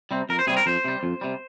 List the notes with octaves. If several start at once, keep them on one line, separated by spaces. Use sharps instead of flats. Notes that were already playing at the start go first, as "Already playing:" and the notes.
C3 G3 C4
F2 A#4
C5
C3 G3 C4 G#4
A#4
F2 C5
C3 G3
F2
C3 G3